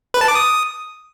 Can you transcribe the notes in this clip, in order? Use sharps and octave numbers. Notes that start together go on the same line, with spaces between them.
B4
A5
D6
D#6